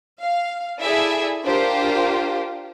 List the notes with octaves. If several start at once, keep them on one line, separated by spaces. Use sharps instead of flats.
F5
E4 G#4 A4 D5 E5
D4 F4 G4 A#4 C5